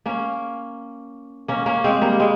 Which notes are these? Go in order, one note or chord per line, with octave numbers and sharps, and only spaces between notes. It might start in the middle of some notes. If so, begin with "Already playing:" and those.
A#3 C#4
A#3 C#4
A#3 C#4
G#3 C4
G3 A#3
G#3 C4